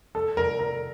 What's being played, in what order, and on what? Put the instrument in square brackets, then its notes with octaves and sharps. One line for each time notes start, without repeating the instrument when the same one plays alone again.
[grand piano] A4
A#4
A#4